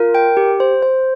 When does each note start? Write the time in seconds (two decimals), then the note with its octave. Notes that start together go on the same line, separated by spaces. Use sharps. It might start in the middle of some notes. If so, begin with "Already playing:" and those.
Already playing: F4 A#4
0.15 G5
0.37 G4
0.60 C5
0.83 C5